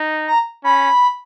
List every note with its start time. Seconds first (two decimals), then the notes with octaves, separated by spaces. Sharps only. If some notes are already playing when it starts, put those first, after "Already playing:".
Already playing: D#4
0.27 A#5
0.64 C#4 B5